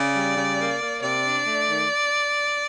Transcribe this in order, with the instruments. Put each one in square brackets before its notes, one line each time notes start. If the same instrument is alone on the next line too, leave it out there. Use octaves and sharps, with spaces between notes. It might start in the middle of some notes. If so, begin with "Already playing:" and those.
Already playing: [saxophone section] C#3 [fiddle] D5
[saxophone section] G3
C#3
A#3
A#3
[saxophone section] C3 [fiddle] D5
[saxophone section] D4
A3
D#3